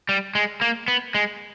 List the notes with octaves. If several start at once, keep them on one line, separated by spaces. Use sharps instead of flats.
G3
G#3
A#3
B3
G#3